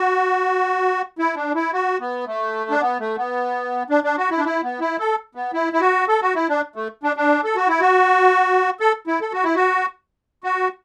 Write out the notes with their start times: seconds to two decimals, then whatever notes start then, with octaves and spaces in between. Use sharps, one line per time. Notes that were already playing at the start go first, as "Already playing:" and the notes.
Already playing: F#4
1.19 E4
1.36 D4
1.55 E4
1.73 F#4
2.00 B3
2.27 A3
2.70 D4
2.81 B3
3.00 A3
3.18 B3
3.90 D4
4.04 D4
4.18 F#4
4.31 E4
4.38 D4
4.45 E4
4.63 B3
4.80 E4
4.99 A4
5.35 B3
5.53 E4
5.73 E4
5.81 F#4
6.08 A4
6.22 F#4
6.35 E4
6.49 D4
6.76 A3
7.03 D4
7.17 D4
7.44 A4
7.56 F#4
7.68 E4
7.81 F#4
8.80 A4
9.07 E4
9.21 A4
9.33 F#4
9.44 E4
9.55 F#4
10.44 F#4